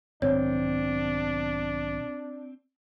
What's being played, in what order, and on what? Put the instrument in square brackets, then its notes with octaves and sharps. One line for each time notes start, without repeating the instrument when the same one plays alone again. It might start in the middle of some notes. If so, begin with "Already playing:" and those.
[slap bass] B1 G#2 D#3 [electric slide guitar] C4 [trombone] D4 [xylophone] C#5